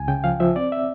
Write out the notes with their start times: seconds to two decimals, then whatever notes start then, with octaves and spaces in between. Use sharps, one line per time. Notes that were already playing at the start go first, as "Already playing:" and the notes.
Already playing: C#2 G#5
0.08 C#3 G5
0.24 F3 F5
0.40 F3 E5
0.56 C4 D5
0.72 E5